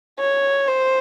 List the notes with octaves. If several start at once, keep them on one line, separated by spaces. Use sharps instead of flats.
C#5
C5